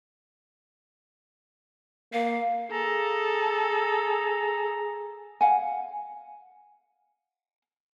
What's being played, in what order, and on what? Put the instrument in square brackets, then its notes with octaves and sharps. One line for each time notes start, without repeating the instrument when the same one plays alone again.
[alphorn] A#3 [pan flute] F5
[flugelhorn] G#4 [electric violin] A4 [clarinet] A#5
[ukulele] F5 F#5 G#5